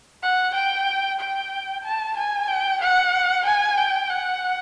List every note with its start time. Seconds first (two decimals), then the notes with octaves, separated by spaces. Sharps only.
0.22 F#5
0.54 G5
1.19 G5
1.84 A5
2.17 G#5
2.48 G5
2.81 F#5
3.45 G#5
3.77 G5
4.10 F#5